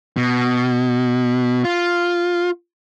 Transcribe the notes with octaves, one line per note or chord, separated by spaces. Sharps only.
B2
F4